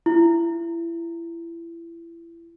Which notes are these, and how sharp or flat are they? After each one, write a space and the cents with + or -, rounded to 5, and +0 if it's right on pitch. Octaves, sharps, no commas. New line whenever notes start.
E4 +30